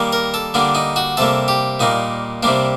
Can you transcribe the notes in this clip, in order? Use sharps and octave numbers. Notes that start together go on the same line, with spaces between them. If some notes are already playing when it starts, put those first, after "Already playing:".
Already playing: D#3 G3 A#3
A#4
A4
D3 G3 A#3 D4
D#4
F#4
C3 G3 A#3 A4
G4
A#2 G3 A#3 D#4
C3 G3 A#3 D4